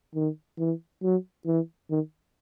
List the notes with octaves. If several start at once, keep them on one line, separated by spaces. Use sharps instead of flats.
D#3
E3
F#3
E3
D#3